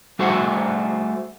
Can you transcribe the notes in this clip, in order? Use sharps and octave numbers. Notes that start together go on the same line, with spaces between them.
G3 A3 F#4 G#4 C5 F#5